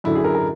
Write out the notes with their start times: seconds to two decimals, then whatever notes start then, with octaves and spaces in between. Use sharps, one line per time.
0.04 F#2 D3 F#3 E4
0.15 G#4
0.24 A#4
0.35 A#4